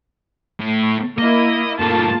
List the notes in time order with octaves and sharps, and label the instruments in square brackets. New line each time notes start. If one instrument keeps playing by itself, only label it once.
[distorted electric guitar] A2
[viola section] A#3 E4 [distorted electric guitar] D#5
[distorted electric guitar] G2 A3 [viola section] A#3 F4 A5